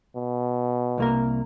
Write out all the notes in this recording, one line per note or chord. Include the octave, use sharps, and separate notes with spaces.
B2
C2 A#3 A#4